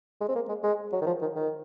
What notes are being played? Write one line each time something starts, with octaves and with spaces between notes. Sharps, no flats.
G#3
C4
A#3
G#3
G#3
F#3
D#3
F3
D#3
D#3